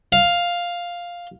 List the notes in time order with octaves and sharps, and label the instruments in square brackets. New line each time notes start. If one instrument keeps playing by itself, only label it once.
[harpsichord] F5